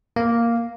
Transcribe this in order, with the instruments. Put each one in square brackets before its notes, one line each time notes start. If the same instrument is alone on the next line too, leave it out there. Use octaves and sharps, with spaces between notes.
[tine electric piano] A#3